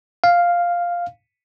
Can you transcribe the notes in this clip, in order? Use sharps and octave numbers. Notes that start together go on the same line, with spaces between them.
F5